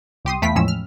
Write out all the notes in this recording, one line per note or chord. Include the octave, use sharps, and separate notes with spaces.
C2 G4 C6 D#6
E2 A3 B4 F5 G5 B6
E2 A2 F3 G#3 C#4 E6
F6